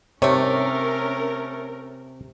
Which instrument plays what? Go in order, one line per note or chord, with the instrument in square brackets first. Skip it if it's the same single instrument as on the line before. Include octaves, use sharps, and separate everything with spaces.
[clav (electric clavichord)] C3 [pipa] D#3 A3 [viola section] C#4 A#4 [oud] C#5